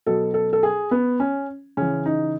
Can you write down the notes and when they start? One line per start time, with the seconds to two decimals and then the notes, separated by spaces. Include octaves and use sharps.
0.06 B2 F#3 A4
0.34 A4
0.53 A4
0.63 G#4
0.91 B3
1.20 C#4
1.77 C#3 E3 C#4
2.06 D#4